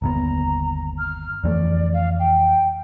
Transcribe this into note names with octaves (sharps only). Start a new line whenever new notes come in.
G1 D#2 B3 A#5
F6
F2 E3 A3 D5
F5
G5